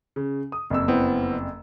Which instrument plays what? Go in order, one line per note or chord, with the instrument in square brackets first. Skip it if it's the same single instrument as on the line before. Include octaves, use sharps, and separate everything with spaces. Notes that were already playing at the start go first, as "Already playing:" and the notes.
[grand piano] C#3
D#6
F#1 F2 E6
[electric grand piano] B3 C4 E4